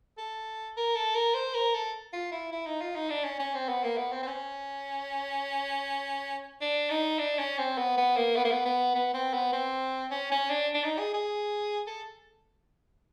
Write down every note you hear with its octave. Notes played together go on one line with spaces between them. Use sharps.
A4
A#4
A4
A#4
C5
A#4
A4
F4
E4
E4
D#4
F4
D#4
D4
C#4
C#4
C4
B3
A#3
B3
C4
C4
C#4
D4
D#4
D4
C#4
C4
B3
B3
A#3
B3
A#3
B3
B3
B3
C4
B3
C4
C#4
C#4
D4
D4
D#4
G#4
G#4
A4